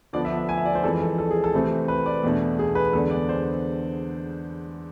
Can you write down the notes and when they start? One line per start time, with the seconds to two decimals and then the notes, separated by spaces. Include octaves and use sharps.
0.13 D3 F3 B3 D4 D5
0.25 E5
0.37 E5
0.49 G#5
0.57 E5
0.65 D5
0.75 C5
0.84 F2 E3 G#3 A4
1.01 A4
1.18 A4
1.31 G#4
1.44 A4
1.53 C3 E3 A3 C4
1.88 B4
2.06 D5
2.23 E2 B2 A3 D4
2.59 G#4
2.75 B4
2.93 E2 D3 G#3 D4 A4
3.11 D5
3.29 C5